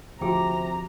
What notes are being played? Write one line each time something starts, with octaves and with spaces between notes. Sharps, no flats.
D2 C3 F3 F#4 G#4 G5 A#5 D6